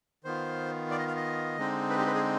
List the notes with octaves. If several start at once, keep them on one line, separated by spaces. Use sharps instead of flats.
D#3 B3 F4 C5
D5
D#5
F5
D#5
D3 G#3 C4 D#4
B4
G4
B4
G#4